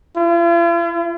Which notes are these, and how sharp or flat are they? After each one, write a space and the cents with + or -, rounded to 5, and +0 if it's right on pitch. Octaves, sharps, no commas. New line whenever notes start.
F4 -45